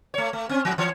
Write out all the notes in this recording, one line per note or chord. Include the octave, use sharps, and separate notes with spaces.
A3 C#5
A3
C4 C#4
A2 F3
E3 C#5